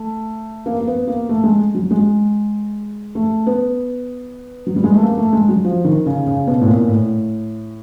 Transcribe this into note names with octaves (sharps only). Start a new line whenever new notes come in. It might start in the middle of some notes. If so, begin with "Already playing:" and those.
Already playing: A3
A#3
A#3
B3
A#3
A3
G#3
F#3
G#3
A3
B3
F#3
G3
G#3
A3
A#3
A3
G#3
F#3
F3
D#3
C#3
C#3
B2
A2
A#2
A2